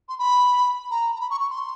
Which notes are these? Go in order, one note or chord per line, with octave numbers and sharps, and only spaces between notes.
C6
B5
A#5
A#5
B5
C#6
C#6
C6